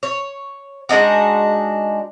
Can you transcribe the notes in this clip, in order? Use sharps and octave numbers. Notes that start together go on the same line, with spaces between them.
C#5
G#3 D4 D#4 F#4